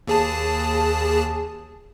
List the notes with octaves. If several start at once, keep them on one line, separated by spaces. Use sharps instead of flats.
D#2 G#4 A5